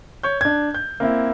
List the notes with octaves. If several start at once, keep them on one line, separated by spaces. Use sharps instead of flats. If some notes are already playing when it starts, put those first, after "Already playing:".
C#5 C#6 G6
D4 G#6
G6
A#3 C4 E4